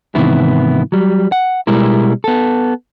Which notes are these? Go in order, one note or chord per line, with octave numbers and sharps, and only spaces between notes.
G#2 C3 D#3 E3 B3 E4
F#3 G3
F#5
B2 G3 G#3 E4 A#4
B3 A4